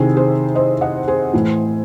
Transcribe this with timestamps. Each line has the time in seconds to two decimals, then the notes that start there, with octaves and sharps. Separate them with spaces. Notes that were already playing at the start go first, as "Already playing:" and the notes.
Already playing: C3 D#3 E4 G#4
0.16 G#4 C5
0.55 C5 D#5
0.81 D#5 F#5
1.08 G#4 C5
1.34 A2 E3